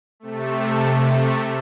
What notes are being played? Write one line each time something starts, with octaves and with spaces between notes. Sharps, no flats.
C3 A3